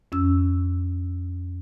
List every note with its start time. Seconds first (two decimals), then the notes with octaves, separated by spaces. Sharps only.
0.12 F2 C#4 E6